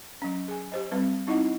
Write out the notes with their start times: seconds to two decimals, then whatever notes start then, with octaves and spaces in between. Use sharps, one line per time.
0.22 F#3 C#4
0.48 G#4 G#5
0.72 G4 C5 D#5
0.91 G3 C4 B4
1.27 C4 D#4 E4 D#5 F#5